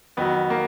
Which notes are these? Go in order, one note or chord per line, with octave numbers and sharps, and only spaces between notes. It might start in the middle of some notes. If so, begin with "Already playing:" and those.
F2 D#3 F#3 B3
A#3